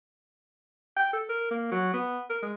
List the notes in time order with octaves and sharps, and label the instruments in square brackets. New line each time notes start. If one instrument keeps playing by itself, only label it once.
[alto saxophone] G5
A4
A#4
A#3
F#3
B3
A#4
G#3